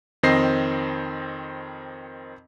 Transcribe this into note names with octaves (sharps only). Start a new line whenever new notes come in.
F2 D#3 C4 D#5 A#6 C7